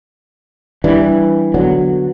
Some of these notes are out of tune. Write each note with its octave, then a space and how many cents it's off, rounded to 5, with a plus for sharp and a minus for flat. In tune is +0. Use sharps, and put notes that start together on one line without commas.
E3 +0 G3 -5 D4 +0
D3 -5 F#3 -10 B3 +0